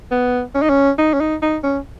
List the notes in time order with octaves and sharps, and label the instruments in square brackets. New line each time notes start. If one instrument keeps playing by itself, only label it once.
[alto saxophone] B3
C#4
D#4
C#4
D#4
C#4
D#4
D#4
C#4